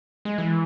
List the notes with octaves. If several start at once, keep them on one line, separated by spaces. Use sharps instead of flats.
G#3
E3